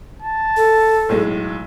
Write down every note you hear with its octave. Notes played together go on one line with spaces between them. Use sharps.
A5
A4
B1 A2 G#3